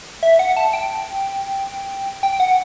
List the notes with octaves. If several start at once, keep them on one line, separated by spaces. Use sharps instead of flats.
E5
F#5
A5
G5
G5
F#5